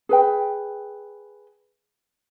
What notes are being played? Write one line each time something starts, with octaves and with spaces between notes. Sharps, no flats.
G#4 B4 G5